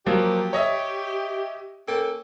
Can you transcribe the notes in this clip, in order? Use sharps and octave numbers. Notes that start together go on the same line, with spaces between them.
F3 F#3 A#3 G4
C#5 D#5 E5
A#3 C#4 A4 G5